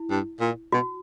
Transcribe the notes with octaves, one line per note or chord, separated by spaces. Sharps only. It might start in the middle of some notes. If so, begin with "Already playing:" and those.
Already playing: E4
G2
A#2
B2 F#4